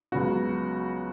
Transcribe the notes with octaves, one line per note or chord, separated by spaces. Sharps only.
C#2 C#3 F#3 B3 F#4